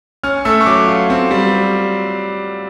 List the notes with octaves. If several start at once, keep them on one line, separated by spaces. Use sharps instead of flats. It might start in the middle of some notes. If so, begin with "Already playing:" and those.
C#4 F6
A3 E6
C#6
F#3 D6
F4
C4
G3